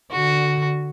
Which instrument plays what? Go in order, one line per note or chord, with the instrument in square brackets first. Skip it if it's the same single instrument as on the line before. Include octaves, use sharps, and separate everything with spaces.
[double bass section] D3 [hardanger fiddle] F#4